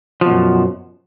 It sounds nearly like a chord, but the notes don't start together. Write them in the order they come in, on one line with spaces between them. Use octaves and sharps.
F3 B2 F#2